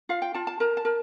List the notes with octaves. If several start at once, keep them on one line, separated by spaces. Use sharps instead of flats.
F4 F5
G5
F4 A5
A5
A#4 A#5
A5
A#4